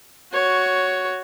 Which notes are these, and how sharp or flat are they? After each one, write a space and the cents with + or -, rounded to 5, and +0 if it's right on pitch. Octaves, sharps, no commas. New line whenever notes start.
F#4 +0 C#5 +5